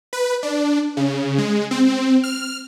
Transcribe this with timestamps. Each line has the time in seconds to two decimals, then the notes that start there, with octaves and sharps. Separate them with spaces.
0.13 B4
0.43 D4
0.97 C#3
1.38 G#3
1.71 C4
2.24 F6